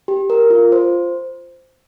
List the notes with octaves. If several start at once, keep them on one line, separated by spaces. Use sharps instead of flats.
G4
A#4
F4
C5